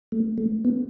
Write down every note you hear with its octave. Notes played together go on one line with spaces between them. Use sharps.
A3
A3
B3